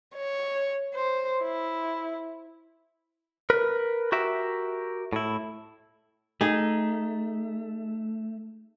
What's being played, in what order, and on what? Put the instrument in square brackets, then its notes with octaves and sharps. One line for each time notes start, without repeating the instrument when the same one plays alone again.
[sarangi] C#5
C5
E4
[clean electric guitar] A#4 B4
F#4 G4 A#4 E5
A2 E4
[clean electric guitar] A3 [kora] D#4 G#4